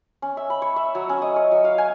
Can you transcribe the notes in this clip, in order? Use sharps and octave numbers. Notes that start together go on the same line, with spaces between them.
C#4
E5
B5
C#5
E5
F#3
C#4
D#5
C#5
F#3
F5
G#5